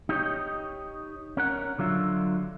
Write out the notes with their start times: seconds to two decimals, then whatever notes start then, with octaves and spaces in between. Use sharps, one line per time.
0.09 D#4 G4 C#5 D#5
1.37 C#4 A#4 F#5
1.78 D3 F#3 F4 E5